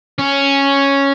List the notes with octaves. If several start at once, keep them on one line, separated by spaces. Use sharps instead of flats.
C#4